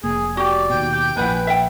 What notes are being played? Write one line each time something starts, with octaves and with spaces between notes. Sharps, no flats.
F1 A#3 G#4
F#4 G4 D5
D#2 B2 G5
G4
A#1 A#2 E4 B4 F#5 G#5
E5 F#5 G5